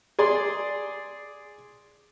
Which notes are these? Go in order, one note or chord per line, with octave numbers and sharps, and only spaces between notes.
G#4 D5 C6